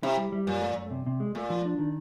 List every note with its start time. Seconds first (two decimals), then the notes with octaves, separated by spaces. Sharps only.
0.03 C3 E4
0.17 G3
0.32 G3
0.47 F#2 A#2
0.61 A3
0.77 F#2
0.91 C3
1.06 C3
1.20 G#3
1.35 A#2 A3
1.50 F3
1.65 D4
1.79 D#3